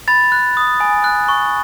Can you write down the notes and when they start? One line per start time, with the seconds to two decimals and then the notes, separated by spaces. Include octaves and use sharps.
0.08 B5 A6
0.32 F#6
0.57 D#6
0.80 G#5
1.04 F#6
1.28 C#6